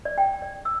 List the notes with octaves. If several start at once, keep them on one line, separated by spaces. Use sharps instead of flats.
D5
G5
D5
E6